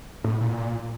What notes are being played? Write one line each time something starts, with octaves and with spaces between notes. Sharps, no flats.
A2
A#2